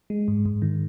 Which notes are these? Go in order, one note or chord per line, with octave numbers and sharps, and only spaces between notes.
G#3
G#2
G#2
D#3